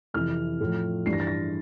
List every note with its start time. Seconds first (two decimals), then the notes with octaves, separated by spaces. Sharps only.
0.14 F2 C3 E3 F6
0.60 A2 F3
1.06 G2 E3 C7
1.13 A#6
1.20 A6
1.27 A#6